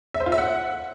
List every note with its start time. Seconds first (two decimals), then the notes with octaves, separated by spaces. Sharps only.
0.14 E5
0.20 C5
0.26 F4
0.32 E5
0.38 F#5